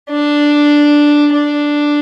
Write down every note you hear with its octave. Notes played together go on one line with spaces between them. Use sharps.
D4
D4